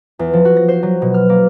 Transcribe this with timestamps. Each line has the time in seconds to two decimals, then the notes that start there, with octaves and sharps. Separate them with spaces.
0.19 E2
0.33 F3
0.45 F#4
0.56 A#6
0.68 C5
0.83 F#3
1.02 B2
1.14 F6
1.29 A#3